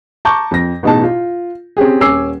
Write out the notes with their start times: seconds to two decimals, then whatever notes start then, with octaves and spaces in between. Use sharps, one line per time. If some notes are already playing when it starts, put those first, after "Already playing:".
0.25 A5 A#5 C#6 D6 G6
0.51 F2 A#6
0.83 A1 B2 D#4 G#4 A5
1.03 F4
1.77 C4 C#4 G4 G#4
2.00 D#1 C#4 G#5 D6 E6 C7